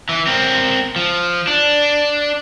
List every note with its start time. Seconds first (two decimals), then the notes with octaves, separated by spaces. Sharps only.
0.09 E3
0.27 C4 A#4
0.96 F3
1.48 D4